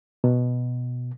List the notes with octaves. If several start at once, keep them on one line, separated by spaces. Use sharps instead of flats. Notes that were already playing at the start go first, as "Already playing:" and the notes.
B2